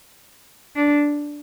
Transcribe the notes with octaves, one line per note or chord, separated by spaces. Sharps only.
D4